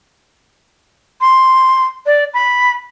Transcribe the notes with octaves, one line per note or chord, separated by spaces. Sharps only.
C6
D5
B5